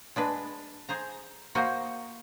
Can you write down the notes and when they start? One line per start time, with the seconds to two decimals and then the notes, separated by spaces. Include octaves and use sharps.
0.16 G#3 D4 B4
0.89 G#4 C5 A#5
1.55 A#3 F#4 C5 D#5 F#5